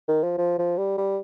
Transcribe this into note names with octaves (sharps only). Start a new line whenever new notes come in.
D#3
F3
F3
F3
G3
G3